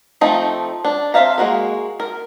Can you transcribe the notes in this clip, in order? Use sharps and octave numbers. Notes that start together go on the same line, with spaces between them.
F3 A3 C4 D#4
D4
C4 C5 E5 F5 A#5
G#3 A#3 F#4 A#4
A#4